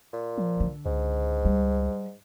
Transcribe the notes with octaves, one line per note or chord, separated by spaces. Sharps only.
A#2
F3
D3
C#2 G#2
G3